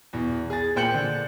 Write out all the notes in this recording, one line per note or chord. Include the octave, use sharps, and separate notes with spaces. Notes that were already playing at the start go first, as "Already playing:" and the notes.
E2 B2
G#4 A6
A#2 C5 G5 G6 C#7 F#7
D3